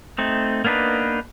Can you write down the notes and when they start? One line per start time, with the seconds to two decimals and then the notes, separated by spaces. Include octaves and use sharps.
0.18 A3 C4 D#4
0.65 A#3 B3 D4 D#4 B4